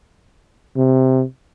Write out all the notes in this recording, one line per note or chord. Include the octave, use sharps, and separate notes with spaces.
C3